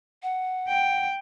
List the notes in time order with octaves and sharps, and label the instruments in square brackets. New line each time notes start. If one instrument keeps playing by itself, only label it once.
[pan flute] F#5
[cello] G5